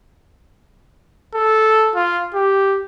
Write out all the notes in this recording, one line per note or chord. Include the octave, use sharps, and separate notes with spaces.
A4
F4
G4